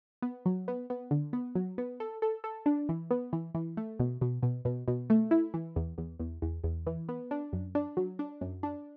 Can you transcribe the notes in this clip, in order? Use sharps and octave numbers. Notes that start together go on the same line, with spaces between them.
B3
F#3
B3
B3
D3
B3
F#3
B3
A4
A4
A4
D4
E3
B3
E3
E3
A3
B2
B2
B2
B2
B2
A3
E4
E3
E2
E2
E2
E2
E2
E3
B3
D4
F#2
D4
F#3
D4
F#2
D4